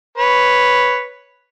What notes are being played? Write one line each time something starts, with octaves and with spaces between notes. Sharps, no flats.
B4 C#5